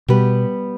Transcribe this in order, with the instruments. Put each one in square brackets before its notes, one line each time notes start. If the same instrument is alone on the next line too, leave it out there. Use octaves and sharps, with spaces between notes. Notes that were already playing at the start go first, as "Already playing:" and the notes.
[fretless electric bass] B2 [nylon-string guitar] G3 B3 G4 B4